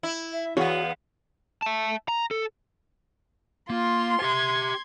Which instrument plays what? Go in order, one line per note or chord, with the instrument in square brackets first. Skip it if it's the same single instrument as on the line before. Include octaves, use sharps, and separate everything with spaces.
[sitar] E4
[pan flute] E5
[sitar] E2 B3 [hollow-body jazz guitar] F#4 G#4 C#5 [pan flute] F5
[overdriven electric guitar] E5 A5
A#5
A4
[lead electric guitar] A#3 [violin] F4 [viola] C6
[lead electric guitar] G4 E5 [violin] G#6